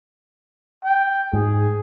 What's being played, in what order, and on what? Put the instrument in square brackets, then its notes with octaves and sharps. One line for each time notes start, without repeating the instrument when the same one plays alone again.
[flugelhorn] G5
[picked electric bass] G#2 [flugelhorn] G#4